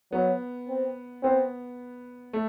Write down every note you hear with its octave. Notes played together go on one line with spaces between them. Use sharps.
F#3 B3
C4
B3 C4
A3